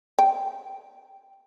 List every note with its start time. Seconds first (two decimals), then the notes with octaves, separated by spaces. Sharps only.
0.19 G5